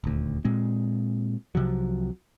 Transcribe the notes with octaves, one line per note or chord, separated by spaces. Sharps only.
D#1 D2
A#2 G#3 C4
C2 C3 F3 F#3